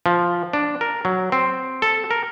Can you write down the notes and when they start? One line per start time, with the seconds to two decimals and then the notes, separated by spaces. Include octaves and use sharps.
0.06 F3
0.53 D4
0.81 A#4
1.05 F#3
1.32 C4
1.82 A4
2.11 A#4